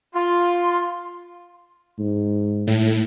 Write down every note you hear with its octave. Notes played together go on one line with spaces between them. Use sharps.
F4 C6
G#2
A2